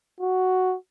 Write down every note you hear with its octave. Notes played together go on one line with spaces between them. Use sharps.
F#4